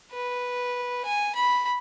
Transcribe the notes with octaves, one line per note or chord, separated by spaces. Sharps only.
B4
G#5
B5